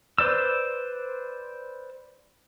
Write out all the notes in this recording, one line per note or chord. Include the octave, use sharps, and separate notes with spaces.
B4 C5 D5 E6